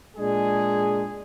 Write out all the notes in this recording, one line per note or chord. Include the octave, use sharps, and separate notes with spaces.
A#2 G#3 D4 G#4